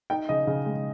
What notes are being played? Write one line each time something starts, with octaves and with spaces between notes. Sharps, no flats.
D#4 G5
C#3 D#5
C#3
G#3